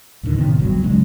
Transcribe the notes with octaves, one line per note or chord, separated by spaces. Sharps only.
D#2 A2 D3 D#3
A2 C3 D#3 B3
G#1 C#2 G2 F#3
C#3 F#3 G#3 C#4